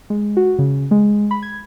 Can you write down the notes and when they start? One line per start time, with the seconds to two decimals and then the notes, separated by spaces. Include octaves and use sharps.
0.10 G#3
0.37 F#4
0.59 C#3
0.91 G#3
1.31 B5
1.43 G#6